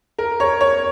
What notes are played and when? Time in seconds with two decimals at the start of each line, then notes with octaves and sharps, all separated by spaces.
0.18 A#4
0.40 C#5
0.61 C#5